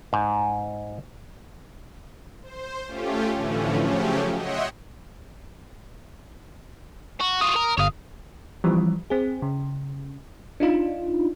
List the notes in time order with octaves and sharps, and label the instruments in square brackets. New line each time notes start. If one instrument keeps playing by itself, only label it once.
[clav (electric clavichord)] G#2
[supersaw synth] C5
A3 C#4 F4 G4
A2 D3 E3 F3 A3 C#4
C#3 F3 F#3 A3 C#4 G4
C#5 D#5 E5 F#5 G5 C6
[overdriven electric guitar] F#4
[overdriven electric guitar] F4 F#4 [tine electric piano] D#6
[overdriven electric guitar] A#4
[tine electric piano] G1 D#6 [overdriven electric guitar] C#5 F5
[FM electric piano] E3 F3 G3 C4
C4 G#4
C#3
D4 D#4 F4